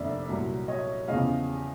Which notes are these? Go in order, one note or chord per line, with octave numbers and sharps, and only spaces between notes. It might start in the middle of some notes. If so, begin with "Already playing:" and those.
Already playing: F1 F2 D3 A#3 D5 E5
C2 A#2 F#3
C#5 D#5
E2 C#3 F3 D#5 F5